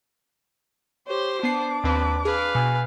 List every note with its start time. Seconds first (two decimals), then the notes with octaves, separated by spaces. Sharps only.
1.07 G4 C5 C#5 C6
1.43 B3 D4 A5 D6 C7
1.84 D#2 C4 B4
2.25 G#4 B4 F5
2.55 B2 G#5